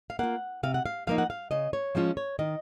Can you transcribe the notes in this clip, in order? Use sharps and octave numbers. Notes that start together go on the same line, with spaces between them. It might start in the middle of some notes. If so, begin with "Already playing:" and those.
F5
A#3 F4 F#5
C3 F5
F#5
F5
F3 A#3 D#4 F5
F#5
F5
C#3 D#5
C#5
F3 G#3 C#4 F4
C#5
D#3 D#5